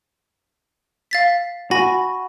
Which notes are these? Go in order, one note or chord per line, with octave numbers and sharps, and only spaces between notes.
F5 A6 B6
F#4 G#5 B5 A#6